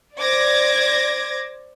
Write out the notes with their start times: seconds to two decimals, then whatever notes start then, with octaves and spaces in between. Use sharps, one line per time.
0.18 C5 D5 D6 G#6 A#6